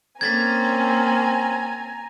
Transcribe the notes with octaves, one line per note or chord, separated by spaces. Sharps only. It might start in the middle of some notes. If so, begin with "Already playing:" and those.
A#3 C4 C#4 G#5 A#5 G#6 A6 B6